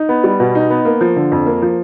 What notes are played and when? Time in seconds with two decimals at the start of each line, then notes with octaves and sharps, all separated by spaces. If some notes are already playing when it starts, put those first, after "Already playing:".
Already playing: D#4
0.09 B3
0.24 G3
0.40 B2
0.55 D#4
0.70 B3
0.85 A#3
1.01 F3
1.16 D3
1.32 F2
1.46 A#3
1.62 F3